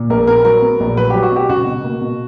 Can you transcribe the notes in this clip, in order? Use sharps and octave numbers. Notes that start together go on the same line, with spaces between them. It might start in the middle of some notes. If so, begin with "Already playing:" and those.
Already playing: A#2
A#1 A#4
B3 A#4
F#3 A#4
B3
A#1
F#3 B4
F#3 G4
F#4
B2 G4
C#2 F#4
B2
A#3
B2